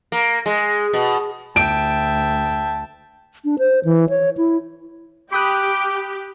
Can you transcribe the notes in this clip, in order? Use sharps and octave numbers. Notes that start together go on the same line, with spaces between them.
A#3
G#3
B2
D2 E5 G5 A5 D7
D4
C5
E3
C#5
E4
G4 G5 B5 D6 D#6 F#6